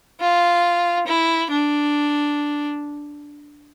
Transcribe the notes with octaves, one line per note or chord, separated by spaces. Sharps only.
F4
E4
D4